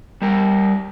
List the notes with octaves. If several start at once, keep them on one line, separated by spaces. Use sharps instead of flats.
G3 A#4